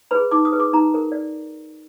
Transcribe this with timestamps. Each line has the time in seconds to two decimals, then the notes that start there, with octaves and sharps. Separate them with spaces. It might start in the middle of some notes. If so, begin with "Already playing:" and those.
0.11 G#4 B4 B5
0.31 D#4 D6
0.45 D#6
0.52 G#4 B4
0.59 D6
0.73 D#4 A#5
0.94 A#4
1.12 D5